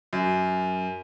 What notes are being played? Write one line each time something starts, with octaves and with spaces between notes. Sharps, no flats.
F#2